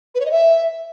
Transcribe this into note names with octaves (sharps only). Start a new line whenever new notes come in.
B4
C#5
D#5
E5